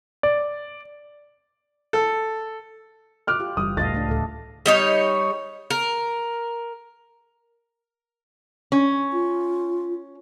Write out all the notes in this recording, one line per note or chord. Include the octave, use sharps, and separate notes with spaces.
D5
A4
D6 F6 F#6
F4 G4
F#1 E3 G3 D#6
C#2 A2 A4 D#5 F5 A6
A3 D4
D1 A3 A4
G3 D#4 C#5
A#4
C#4
F4